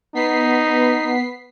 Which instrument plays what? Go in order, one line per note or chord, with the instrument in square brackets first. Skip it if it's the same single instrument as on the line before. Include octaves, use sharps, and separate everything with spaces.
[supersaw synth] B3 B6 C7 [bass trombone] D#4